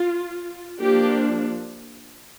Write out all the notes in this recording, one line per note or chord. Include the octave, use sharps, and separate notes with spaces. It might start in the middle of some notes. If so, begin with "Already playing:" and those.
Already playing: F4
F3 A#3 D4 G4